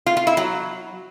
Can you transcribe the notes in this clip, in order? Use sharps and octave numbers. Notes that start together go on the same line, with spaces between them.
F4
F4
E4
F#3